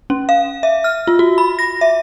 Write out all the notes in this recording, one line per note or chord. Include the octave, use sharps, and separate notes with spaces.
C#4
F5
E5
F6
F4
F#4
B5
A#6
E5